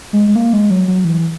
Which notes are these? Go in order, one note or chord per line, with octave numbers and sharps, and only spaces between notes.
G#3
G#3
A#3
G#3
F#3
F#3
E3